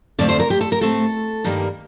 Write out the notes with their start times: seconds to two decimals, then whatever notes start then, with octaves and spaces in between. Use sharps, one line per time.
0.19 F2 D3 F3 A3 D5
0.29 C5
0.40 A#4
0.50 G4
0.61 A4
0.72 A#4
0.81 A2 A3 C4 A4
1.44 G2 D#3 G3 A#3